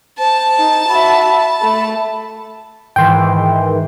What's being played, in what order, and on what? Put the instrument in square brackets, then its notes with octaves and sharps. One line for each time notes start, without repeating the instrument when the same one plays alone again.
[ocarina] C5 [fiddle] A5
[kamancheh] D#4
[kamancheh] F#4 E5 [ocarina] B5
[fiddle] A5
[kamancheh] A3 [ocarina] B5
[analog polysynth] G#2 D#3 E3 [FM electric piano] G5 C6